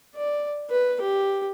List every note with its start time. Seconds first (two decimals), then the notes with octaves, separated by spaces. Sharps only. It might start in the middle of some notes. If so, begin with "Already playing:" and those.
0.16 D5
0.70 B4
1.01 G4